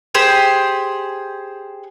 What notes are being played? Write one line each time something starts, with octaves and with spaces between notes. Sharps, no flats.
G4 G#4 C5